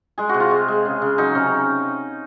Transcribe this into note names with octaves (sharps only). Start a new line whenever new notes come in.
G#3 G#4
C3 F#4
F4
G#3
G#3
C#3
C#3
F#3 D#4
C3 C#4